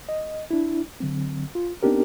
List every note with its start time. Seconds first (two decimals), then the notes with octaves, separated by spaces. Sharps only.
0.09 D#5
0.51 D4 E4
1.00 D3 F#3 C4
1.55 F4
1.83 B3 C4 D4 D#4 G4 A#4